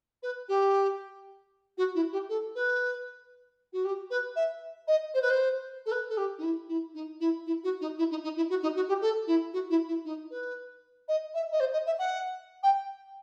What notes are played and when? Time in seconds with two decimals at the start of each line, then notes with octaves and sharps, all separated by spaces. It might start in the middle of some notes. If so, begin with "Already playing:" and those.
0.22 B4
0.48 G4
1.77 F#4
1.94 E4
2.12 G4
2.29 A4
2.55 B4
3.72 F#4
3.84 G4
4.10 B4
4.36 E5
4.87 D#5
5.14 C5
5.22 B4
5.30 C5
5.86 A4
5.91 B4
6.09 A4
6.17 G4
6.38 D#4
6.43 E4
6.68 E4
6.94 D#4
7.20 E4
7.46 E4
7.63 F#4
7.81 D#4
7.98 E4
8.10 D#4
8.23 D#4
8.36 E4
8.49 F#4
8.62 D#4
8.76 F#4
8.88 G4
9.01 A4
9.27 E4
9.53 F#4
9.70 E4
9.87 E4
10.05 D#4
10.30 B4
11.08 D#5
11.34 E5
11.52 D#5
11.60 C5
11.73 D#5
11.86 E5
11.98 F#5
12.63 G5